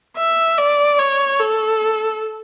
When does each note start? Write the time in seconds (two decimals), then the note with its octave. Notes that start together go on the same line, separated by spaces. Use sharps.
0.17 E5
0.58 D5
0.99 C#5
1.40 A4